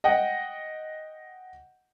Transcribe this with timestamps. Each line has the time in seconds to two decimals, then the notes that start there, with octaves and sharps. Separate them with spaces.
0.04 D#5 F#5 G5